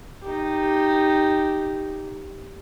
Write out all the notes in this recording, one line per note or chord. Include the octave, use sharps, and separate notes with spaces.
D#4 G4